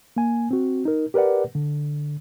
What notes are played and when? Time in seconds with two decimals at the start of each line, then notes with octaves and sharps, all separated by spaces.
0.16 A#3 G#5
0.51 C4 F#4
0.85 D#4 A#4
1.14 G4 A#4 B4 D5 F#5
1.55 D3